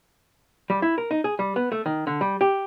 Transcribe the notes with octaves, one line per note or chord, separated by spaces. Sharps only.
G3
E4
A#4
D#4
G#4
G3
B3
A3
D#3
D3
G3
G4